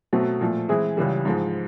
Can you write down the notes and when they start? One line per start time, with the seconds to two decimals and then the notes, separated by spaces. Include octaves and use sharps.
0.13 B2 F#3 A3 C4
0.41 A#2 F3 A3
0.69 E3 G#3 C4 E4 G#4
0.97 C#2 C#3 E3 G3
1.25 G#2 F3 G#3